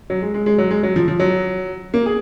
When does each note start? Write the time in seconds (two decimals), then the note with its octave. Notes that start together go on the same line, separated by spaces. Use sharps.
0.10 F#3
0.22 G#3
0.34 G#3
0.46 G#3
0.58 F#3
0.71 G#3
0.83 F#3
0.96 F3
1.08 F3
1.20 F#3
1.94 A#3
2.06 G#4